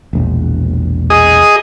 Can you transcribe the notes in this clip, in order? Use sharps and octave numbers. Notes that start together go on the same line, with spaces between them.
E1 A#1
G#4 D#5